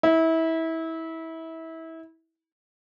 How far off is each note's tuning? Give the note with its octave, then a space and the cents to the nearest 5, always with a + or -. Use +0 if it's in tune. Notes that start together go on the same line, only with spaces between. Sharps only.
E4 -25